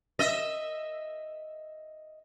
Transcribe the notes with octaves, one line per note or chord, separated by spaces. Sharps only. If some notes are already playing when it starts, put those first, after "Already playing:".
D#5 E5